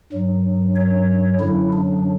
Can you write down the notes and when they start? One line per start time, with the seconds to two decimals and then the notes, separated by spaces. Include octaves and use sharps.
0.13 G2 F#3
0.76 C#5
1.40 F#2 D3 F#3 E4
1.73 D4